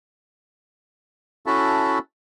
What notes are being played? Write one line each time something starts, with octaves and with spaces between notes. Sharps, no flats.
C#4 E4 F#4 A4 E5 A5